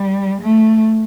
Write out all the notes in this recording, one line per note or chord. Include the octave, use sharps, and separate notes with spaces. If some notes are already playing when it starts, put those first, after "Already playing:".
Already playing: G3
A3